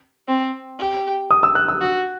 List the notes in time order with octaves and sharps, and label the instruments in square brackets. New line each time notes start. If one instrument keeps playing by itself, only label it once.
[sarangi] C4
G4
[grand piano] D#6
E6
F#6
E6
[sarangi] F#4